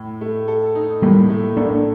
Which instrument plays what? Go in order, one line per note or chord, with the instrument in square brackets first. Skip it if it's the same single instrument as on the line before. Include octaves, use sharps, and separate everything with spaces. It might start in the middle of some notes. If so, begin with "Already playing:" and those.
Already playing: [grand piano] A2
A3
A4
D#4
[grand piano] A2 [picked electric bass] G3 A#3
[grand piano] A3
[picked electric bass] A#3 D4 [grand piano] A4